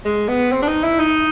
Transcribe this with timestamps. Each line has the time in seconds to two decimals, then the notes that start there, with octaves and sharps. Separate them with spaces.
0.05 G#3
0.28 B3
0.52 C4
0.62 D4
0.68 D#4
0.84 E4
0.99 D#4